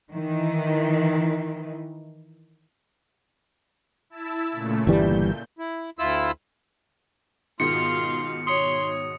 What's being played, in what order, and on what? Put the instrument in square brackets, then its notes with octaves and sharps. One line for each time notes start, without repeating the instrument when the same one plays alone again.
[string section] D#3 E3
[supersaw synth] E4 A5 E6
A#2 C#3 A3
[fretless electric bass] G1 E3 G3 [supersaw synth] A#2 G6
[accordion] E4
D2 E4 F4 E6
[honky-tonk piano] G#2 B2 D#3 [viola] F4 F5 [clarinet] C6 [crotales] C#7
[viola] C#5 [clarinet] C6 [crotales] D#6 C#7